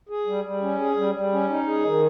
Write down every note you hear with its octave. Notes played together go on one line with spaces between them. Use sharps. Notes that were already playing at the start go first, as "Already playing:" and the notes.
G#4
G3
G3
C#4
G#4
G3
G3
C#4
D#4
G#4
D#3